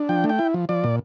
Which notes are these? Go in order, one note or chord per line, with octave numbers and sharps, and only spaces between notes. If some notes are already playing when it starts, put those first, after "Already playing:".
Already playing: D4
F3 G5
A3
G5
E4
F3
F3 D5
A#2